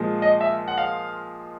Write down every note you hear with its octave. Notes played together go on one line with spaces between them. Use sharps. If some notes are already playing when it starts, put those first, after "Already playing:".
Already playing: A#2 F3 G#3
D#5
E5
F#5
F5